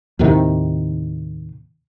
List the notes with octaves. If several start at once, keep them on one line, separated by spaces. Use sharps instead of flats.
D#2 A2 C3 D#3